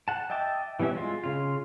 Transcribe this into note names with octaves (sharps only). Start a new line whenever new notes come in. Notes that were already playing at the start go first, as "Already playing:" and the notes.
F#5 A5
D#5 E5 G5 A5 D6
E3 G3 B3 C#4 E5
G#3 F4
C#3 F4